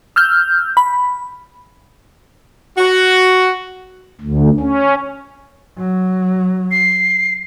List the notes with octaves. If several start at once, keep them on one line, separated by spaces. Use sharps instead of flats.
E6 F6 G6
B5
F#4
D2
C#4
F#3
C7